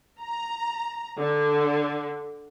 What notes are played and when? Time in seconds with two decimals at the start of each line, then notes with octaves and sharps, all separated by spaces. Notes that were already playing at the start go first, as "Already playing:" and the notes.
0.22 A#5
1.19 D3